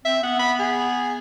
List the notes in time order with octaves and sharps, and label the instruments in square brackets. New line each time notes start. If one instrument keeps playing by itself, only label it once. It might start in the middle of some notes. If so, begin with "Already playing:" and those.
[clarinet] C4 [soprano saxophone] E5
[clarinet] B3 [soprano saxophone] F#5
[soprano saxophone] B5
G#4